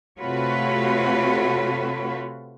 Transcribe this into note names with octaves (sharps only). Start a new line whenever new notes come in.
C3 A3 F4 F#4 B4 C#5